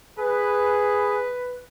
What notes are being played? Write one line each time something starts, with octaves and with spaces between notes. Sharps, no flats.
G#4 B4